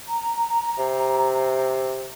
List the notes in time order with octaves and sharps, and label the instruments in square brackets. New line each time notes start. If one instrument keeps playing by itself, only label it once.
[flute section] A#5
[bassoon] C3